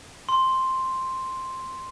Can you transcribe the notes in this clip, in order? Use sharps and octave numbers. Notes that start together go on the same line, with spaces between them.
C6